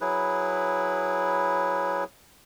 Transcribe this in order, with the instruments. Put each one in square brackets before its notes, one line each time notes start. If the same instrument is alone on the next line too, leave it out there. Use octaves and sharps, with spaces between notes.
[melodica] F#3 E4 G#4 B4